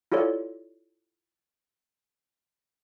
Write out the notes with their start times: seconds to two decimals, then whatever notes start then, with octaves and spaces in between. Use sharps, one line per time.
0.12 E4 F4 G4 A4 C#5 D5